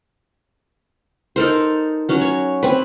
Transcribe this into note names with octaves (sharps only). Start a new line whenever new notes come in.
D#4 A4 A#4 C5
F#3 C#4 F#4
C#5
C4 B4